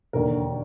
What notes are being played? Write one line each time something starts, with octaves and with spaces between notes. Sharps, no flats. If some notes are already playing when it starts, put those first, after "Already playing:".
E1 D#2 D3 A#4